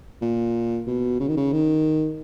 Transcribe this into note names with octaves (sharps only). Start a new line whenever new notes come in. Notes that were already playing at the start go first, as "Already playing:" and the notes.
A#2
B2
C#3
D#3
C#3
D#3